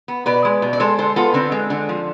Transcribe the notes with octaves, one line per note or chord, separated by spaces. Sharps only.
B3
B2 B4 D5
G#3
B2
D5
G#3 A4 C5
D3 A4 C5
B3 F4 A4
D3 C4
G#3
D3
F3